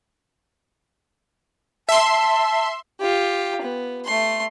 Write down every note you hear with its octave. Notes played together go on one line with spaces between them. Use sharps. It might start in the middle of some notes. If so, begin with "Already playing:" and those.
E5 A5 C6
F4 G4
B3
A3 C6